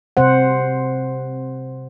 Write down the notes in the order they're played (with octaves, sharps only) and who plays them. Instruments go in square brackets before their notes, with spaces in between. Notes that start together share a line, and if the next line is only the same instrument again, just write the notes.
[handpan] C3 C4 C5 F#5